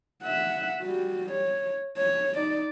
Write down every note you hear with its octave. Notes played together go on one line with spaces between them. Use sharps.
E5 F#5
G3 F#4
C#5
C#5
D#4 D5